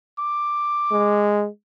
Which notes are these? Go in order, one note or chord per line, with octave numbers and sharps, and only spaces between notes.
D6
G#3